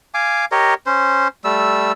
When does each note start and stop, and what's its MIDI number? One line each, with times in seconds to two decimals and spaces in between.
0.14 0.45 77
0.14 0.45 80
0.14 0.45 86
0.52 0.74 67
0.52 0.74 70
0.52 0.74 73
0.52 0.74 75
0.86 1.28 61
0.86 1.28 72
1.44 1.92 55
1.44 1.92 57
1.44 1.92 88